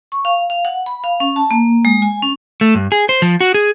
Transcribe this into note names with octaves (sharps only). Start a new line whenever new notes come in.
C#6
F5
F5
F#5
B5
F5
C#4
A5
A#3
G#3
G#5
C#4
A3
G2
G#4
C5
F3
F#4
G#4